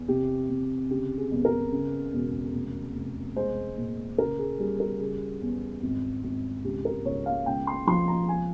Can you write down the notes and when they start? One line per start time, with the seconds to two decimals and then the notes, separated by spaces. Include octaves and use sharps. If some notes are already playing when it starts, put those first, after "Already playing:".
Already playing: E2
0.08 C3 G4
0.49 C3
0.90 C#3 G4
1.18 G#4
1.31 G1
1.45 A#4
1.72 C#3
2.13 E1
2.55 F1
2.95 F1
3.36 G#3 C5
3.77 A#2
4.18 C#3 A#4
4.39 G#4
4.59 G3 G#4
4.80 A#4
5.00 C#3 G#4
5.42 E2
5.82 G#1
6.24 G#1
6.64 C#2 G4
6.85 A#4
7.05 C#2 C#5
7.26 F5
7.46 C#2 G5
7.67 C6
7.87 F3 C6
8.08 A#5
8.29 G#5